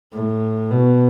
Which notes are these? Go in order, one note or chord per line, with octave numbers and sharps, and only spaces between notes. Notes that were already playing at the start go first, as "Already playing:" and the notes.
A2
B2